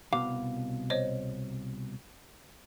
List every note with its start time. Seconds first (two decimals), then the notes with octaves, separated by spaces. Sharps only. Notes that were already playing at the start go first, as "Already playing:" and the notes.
0.13 C2 B2 F5 D6
0.90 C5 C#5 D#5